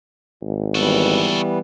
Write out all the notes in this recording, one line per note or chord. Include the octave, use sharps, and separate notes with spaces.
G#1
E3 G3 B3 F#4 A4